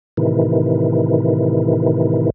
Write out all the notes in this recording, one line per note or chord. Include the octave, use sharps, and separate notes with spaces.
A2 C3 D#3 E3